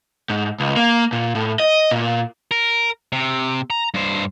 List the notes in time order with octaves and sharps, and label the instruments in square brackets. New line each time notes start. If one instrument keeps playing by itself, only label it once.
[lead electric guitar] G#2
C#2
A#3
A#2
A2
D#5
A#2
[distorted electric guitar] A#4
C3
A#5
G2 C5